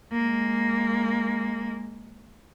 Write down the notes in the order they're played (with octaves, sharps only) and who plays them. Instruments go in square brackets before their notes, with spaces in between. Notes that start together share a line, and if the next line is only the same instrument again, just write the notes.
[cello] G#3 A#3